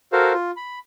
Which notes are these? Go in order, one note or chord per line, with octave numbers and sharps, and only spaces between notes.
F#4 A4 A#4 C5 F5
F4
B5